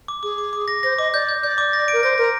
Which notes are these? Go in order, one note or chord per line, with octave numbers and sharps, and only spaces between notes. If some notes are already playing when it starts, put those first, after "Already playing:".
D6
G#4 D6
D6
D6
A#6
C5 A#6
D#5 D6
D5 G6
G6
D5 G6
D6
A#6
A#4 D7
C5 A#6
A#4 A#6